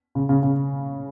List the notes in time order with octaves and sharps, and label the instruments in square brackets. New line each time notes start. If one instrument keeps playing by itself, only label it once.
[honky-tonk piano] C#3
C#3
C#3